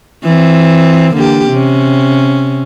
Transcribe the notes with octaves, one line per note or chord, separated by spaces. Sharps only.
E3 C4
D3 A#3 G4
C3 C#4